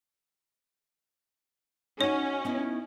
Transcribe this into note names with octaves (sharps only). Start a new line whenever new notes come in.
C#4 D#4 F#4 C#5
B3 D#4 E4